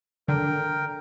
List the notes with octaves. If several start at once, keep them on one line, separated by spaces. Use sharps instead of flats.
D3 A#4 G5